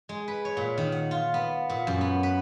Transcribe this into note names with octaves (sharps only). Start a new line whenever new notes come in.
G#3
B4
C#5
A#2
D#3
F#5
F4
B3
A#2
F#2
B3
B4